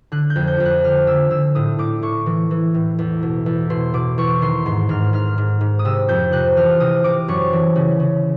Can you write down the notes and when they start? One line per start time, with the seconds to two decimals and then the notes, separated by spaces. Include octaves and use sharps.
0.12 D3 F#6
0.30 G6
0.36 F2
0.47 G6
0.60 F2 F#6
0.84 D3 F6
1.07 D3 E6
1.31 D3 E6
1.55 A2 D#6
1.79 A2 D6
2.02 A2 C#6
2.26 E3
2.51 E3
2.74 A2
2.99 E2
3.22 B2
3.46 E2
3.70 B2 C6
3.94 B2 D6
4.18 E2 C#6
4.42 D#3 C6
4.66 G#2 C6
4.89 G#2 F6
5.13 G#2 F6
5.38 G#2
5.61 G#2
5.79 D#6
5.85 C3 E6
6.09 F2 G6
6.32 C3 F#6
6.57 E3 F6
6.80 C3 D#6
7.04 C3 D6
7.28 F#2 C#6
7.53 E3
7.76 C#3
8.00 C#3